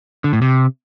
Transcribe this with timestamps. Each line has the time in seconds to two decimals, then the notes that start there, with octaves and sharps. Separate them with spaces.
0.24 D3
0.33 A2
0.42 C3